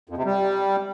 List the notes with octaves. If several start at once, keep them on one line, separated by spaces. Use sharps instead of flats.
F2
C3
G3